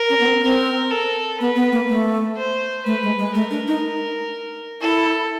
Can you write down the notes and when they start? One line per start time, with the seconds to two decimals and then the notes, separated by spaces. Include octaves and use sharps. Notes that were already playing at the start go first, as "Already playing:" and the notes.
Already playing: A#4
0.09 C#4
0.20 B3
0.25 C4
0.42 C4 A#4
0.91 A4
1.40 B3 B4
1.56 B3
1.72 A#3
1.89 A3
2.37 C5
2.86 A3 B4
3.03 G#3
3.18 G#3
3.34 A3 A#4
3.51 D4
3.68 D#4
4.82 E4 A4